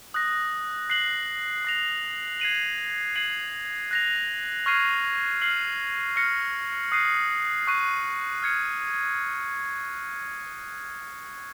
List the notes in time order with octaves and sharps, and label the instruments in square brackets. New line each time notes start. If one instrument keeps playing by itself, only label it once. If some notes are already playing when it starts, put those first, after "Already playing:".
[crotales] D#6 F#6 A#6
F#6 C7 F#7
D#6 A#6 F7
G#6 C7 D#7 F#7
G#6 C7 D#7 F#7
F#6 A#6 F7
C#6 F6 G#6 C7 D#7
F6 C7 F#7
F6 A#6 C#7
D#6 F#6 C7 D#7
C#6 F#6 C7 D#7
F6 G#6 C#7